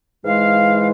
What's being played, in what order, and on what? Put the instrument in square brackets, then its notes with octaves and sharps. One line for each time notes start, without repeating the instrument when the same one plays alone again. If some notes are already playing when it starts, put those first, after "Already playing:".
[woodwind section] G#2 E3 G#3 F5